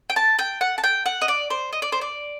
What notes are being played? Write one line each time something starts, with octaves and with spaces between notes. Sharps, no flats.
G5
A5
G5
F#5
A5
G5
F#5
D#5
D5
C5
D#5
D5
C5
D5